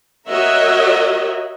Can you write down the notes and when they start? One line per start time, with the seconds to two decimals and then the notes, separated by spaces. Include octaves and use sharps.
0.28 F#4 A#4 C#5 D#5 E5